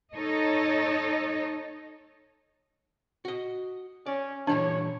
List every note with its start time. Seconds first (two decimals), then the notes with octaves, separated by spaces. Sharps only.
0.14 D#4 A4 C#5 D#5
3.25 F#4 D#5
4.06 C#4 D5
4.47 A#2 E3 G3 D4 C#5